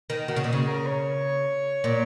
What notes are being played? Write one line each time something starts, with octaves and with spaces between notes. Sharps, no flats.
D#3
D#3 F#4
C#3
A#2
C#3
A#4
C#5
A#2